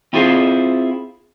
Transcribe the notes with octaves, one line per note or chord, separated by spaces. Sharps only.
C4 E4 F4 G#4 C5 F5